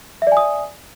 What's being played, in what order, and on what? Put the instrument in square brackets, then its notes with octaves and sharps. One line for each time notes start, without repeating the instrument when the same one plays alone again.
[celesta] E5
D5
G#5
D#6